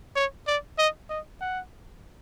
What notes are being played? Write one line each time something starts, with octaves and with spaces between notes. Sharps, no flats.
C#5
D5
D#5
D#5
F#5